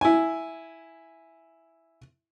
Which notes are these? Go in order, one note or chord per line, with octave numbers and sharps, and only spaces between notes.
E4 G#5